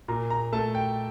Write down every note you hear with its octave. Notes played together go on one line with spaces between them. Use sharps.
A#2 A#5
A#5
A3 A5
G5